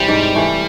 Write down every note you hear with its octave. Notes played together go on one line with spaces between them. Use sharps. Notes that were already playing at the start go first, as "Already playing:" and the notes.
Already playing: C3 E3 G3 C4
G#2
E3 A3